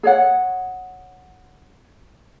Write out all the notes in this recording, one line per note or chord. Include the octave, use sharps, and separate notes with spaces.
G#4 C#5 F#5